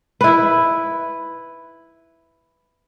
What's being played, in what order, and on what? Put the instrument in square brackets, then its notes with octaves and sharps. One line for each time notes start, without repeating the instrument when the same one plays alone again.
[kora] E4 B4